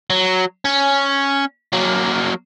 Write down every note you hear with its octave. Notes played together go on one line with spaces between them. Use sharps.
F#3
C#4
F#3 A#3